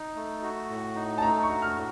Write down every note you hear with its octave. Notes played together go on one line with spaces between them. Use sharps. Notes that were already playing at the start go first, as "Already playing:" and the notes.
Already playing: D#4
A3
F#4
A2
D#4
A5
A3 A#5
C#6
F#4
F6
A2